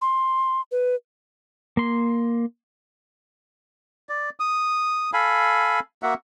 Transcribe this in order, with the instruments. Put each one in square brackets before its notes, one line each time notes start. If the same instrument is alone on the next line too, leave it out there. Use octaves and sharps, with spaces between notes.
[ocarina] C6
B4
[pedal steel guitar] A#3 C6
[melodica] D5
D#6
A4 F5 G#5 B5
A#3 F#4 E5 F#5